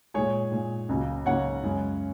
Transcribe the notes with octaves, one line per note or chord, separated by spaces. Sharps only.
A#2 G#3 G#4 C#5
A#2 G#3
C#2 C#3 F#3 A#3
C#2 C#3 F#3 A#3 C#5 F#5
F#2 C#3 G#3